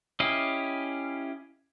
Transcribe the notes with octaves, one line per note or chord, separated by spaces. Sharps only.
C#4 E4 G4 D#5 F5